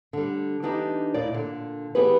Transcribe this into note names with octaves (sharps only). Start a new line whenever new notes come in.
D3 G3
E3 B3 D4 D#4 G4
D#2 A#2 A#3 E4 D5
A#2 D3
E3 B3 G4 G#4 B4